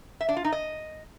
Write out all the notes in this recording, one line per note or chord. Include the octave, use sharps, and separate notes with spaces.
E5
D4
F4
D#4
D#5